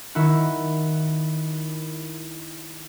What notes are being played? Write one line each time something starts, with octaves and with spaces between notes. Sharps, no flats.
D#3 E4 F#4